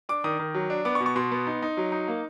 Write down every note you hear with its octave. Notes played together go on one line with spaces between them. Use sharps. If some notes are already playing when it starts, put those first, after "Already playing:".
D4 D6
D#3 D#6
D#3
F#3
D4
B3 D6
C#6
B2
C#6
B2 C6
B3
D#4
D#4
F#3
D#4
A#3